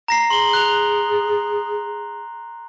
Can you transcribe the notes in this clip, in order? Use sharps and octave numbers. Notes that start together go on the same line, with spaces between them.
A#5 A#6 C7
G#4 C6 F#7 G7
F#6 F7